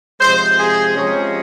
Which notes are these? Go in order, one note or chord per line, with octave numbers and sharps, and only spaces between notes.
C3 F3 G#3 C5
G#4
C3 F3 G#3 C#4